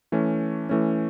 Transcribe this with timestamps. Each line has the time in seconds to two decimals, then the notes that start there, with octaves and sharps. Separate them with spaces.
0.12 E3 A3 C#4
0.69 E3 A3 C#4